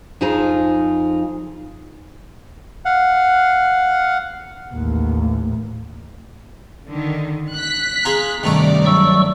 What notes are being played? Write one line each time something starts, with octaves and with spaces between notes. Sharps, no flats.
F2 F3 D#4 F4 G#4 G#5
F5 F#5
A1 D#2
D3 D#3
F#6 B6
F4 G#4 A#5
G2 C3 D#3 A3 D5 A#5
F#3 C#6 E6